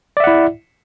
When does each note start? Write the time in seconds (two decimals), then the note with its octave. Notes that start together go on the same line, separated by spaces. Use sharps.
0.17 D5
0.20 E5
0.24 F#5
0.27 E4